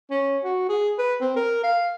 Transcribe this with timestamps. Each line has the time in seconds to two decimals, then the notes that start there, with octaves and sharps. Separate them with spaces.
0.10 C#4
0.44 F#4
0.69 G#4
0.98 B4
1.21 C4
1.36 A#4
1.63 F5